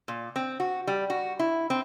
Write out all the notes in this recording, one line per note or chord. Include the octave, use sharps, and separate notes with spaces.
A#2
C4
F#4
G3
F#4
E4
C4